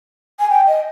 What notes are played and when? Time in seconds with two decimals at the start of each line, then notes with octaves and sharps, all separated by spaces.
0.39 G#5
0.50 G5
0.67 D#5